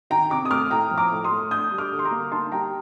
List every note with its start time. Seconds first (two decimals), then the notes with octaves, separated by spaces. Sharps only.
0.10 D#3 G5 A#5
0.30 C3 A#5 D6
0.45 D#6
0.51 A3 D6 F6
0.70 A2 G5 A#5
0.91 F3
0.98 A#5 D6
1.12 A2
1.24 C6 D#6
1.31 A3
1.51 D4 D#6 G6
1.71 G3
1.78 D6 F6
1.92 D3
1.99 C6
2.05 A#5 D6
2.11 A#3
2.32 D#4 A5 C6
2.52 G3 G5 A#5